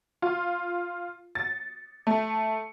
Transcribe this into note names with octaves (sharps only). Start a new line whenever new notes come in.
F4
A6
A3